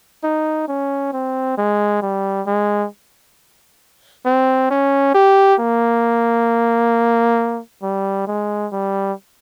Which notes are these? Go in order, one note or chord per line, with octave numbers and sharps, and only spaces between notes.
D#4
C#4
C4
G#3
G3
G#3
C4
C#4
G4
A#3
G3
G#3
G3